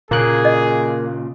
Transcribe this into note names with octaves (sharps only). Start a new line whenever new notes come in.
A#2 C#3 A#3 G#4 F#6
D#5